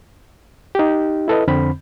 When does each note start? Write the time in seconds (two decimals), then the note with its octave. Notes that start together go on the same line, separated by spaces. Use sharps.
0.75 D#4 G4
1.28 E4 A4 B4 D#5
1.48 F2 D3 C4 B5